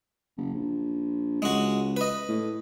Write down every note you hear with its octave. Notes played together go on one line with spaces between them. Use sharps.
F#1
A#1
C#2 G#3 F#4
B4 D#5
A2